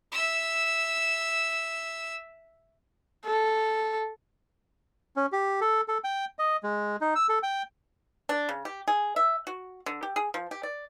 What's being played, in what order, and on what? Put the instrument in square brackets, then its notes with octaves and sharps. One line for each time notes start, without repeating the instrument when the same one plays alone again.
[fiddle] E5 E6
[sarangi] A4
[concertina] C#4
G4
A4
A4
G5
D#5
G#3
D#4
E6
A4
G5
[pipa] D4
C#3
G4
G#4
E5
F#4
D3
G4
G#4
F3
G4
D5